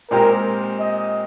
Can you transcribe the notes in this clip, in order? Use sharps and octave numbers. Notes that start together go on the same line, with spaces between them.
A#2 G#3 C4 G4 A#4
D#5